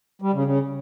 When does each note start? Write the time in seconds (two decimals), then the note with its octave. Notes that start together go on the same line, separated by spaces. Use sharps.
0.22 G3
0.33 C#3
0.45 C#3